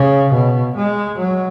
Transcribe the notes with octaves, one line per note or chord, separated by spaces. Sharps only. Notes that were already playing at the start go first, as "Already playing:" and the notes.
Already playing: C#3
B2
G#3
F#3